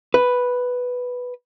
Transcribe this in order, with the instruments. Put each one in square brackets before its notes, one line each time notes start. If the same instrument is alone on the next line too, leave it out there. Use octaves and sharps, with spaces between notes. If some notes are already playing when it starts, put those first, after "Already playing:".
[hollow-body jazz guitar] B4